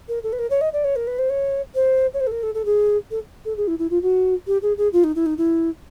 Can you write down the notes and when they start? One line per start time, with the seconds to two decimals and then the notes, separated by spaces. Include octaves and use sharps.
0.08 A#4
0.23 A4
0.33 B4
0.39 A#4
0.50 C#5
0.61 D#5
0.73 D5
0.84 C#5
0.96 A#4
1.07 B4
1.19 C5
1.30 C#5
1.75 C5
2.14 C#5
2.20 C5
2.27 A4
2.32 A#4
2.43 A4
2.54 A4
2.65 G#4
3.11 A4
3.45 A4
3.57 G#4
3.67 E4
3.79 E4
3.90 F4
4.02 F#4
4.47 G4
4.62 G#4
4.78 G#4
4.93 F4
5.04 D#4
5.15 E4
5.26 D#4
5.38 E4